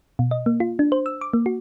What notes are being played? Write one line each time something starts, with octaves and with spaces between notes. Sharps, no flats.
B2
D#5
A#3
F4
D4
C5
E6
D6
A#3
F#4